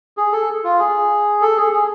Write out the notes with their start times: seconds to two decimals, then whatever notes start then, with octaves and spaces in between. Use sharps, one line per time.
0.17 G#4
0.33 A4
0.64 F4
0.79 G#4
1.41 A4
1.57 G#4
1.73 G#4